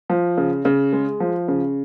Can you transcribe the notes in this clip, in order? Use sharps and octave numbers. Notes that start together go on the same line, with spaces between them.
F3
C#3
C#3
G#3
F3
C#3